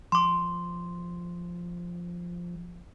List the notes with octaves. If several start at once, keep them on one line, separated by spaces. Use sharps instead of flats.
F3 C6 D6